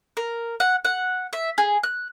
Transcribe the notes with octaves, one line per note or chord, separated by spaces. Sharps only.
A#4
F#5
F#5
E5
G#4
F#6